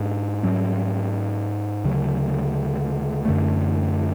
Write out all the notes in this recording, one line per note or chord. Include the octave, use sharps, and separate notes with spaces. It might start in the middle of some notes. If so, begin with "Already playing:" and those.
Already playing: G#2 G#3 D4
G#2 F#3 C#4
D2 C#3 F#3
F#2 D3 A3